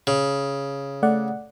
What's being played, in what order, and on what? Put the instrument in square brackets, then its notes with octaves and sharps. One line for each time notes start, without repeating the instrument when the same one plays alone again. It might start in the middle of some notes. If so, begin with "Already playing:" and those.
[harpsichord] C#3
[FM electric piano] A3 D5 F#5